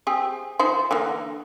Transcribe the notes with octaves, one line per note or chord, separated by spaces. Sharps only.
C4 G4 G#4
F3 D#4 C5
D3 E3 A#3